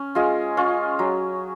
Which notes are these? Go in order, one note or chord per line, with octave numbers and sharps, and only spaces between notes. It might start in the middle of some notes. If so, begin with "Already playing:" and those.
Already playing: C#4
G#3 F4 G#4
C#4 F4
F#3